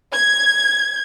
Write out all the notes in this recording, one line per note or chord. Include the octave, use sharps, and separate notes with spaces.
G#6